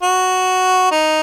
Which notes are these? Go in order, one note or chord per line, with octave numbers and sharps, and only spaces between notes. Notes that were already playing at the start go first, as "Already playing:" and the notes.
F#4
D#4